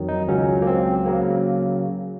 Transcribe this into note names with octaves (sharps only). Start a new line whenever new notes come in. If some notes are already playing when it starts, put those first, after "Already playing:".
Already playing: F2 D#3 F#3
D#4
C#2 C#3 F#3 C#4
A#3
C4
C#3 F#3 A#3